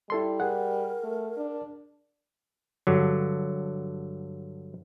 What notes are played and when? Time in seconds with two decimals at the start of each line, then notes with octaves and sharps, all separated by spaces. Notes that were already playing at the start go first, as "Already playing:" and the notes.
0.10 G3 E4 A4 C6
0.40 G#4 A#4 F#5
1.03 A3
1.37 D4
2.87 G2 D3 F#3